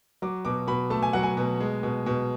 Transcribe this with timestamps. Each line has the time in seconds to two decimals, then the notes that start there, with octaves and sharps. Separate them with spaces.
0.22 F#3 D6
0.45 B2 D6
0.67 B2 B5
0.90 A3 A5
1.03 G#5
1.13 F#3 F#5
1.23 G#5
1.37 B2
1.60 G#3
1.83 B2
2.06 B2